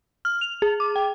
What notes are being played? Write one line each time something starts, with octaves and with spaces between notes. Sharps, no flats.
F6
F7
G#4
D6
G5